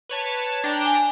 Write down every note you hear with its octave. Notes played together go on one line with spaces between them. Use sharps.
B4 C#5 A5
D4 G5 A#5
G#5